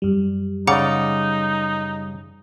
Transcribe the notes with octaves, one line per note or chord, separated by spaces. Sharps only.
F#2 G3
C#3 D#4 D5 F#5 A#5 D6